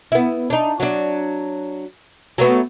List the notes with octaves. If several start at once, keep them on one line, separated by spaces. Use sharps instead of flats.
B3 E4
D4 D#4
F#3 D4
F#3 A3 B3